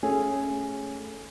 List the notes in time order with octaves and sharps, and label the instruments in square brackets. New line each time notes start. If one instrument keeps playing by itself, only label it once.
[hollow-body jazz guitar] A3 C#4 G#4